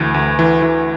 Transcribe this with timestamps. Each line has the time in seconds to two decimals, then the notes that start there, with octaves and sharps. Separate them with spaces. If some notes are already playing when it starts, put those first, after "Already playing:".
Already playing: D2 E3
0.14 D2
0.39 E3
0.62 E3